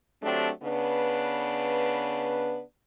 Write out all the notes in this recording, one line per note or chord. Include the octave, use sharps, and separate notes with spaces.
F#3 A3 C4 D4 G4
C#3 B3 D4 B4